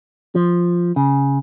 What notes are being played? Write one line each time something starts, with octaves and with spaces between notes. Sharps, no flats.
F3
C#3